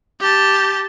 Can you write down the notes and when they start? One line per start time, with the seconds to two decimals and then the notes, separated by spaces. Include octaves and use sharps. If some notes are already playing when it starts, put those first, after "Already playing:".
0.21 G4 A5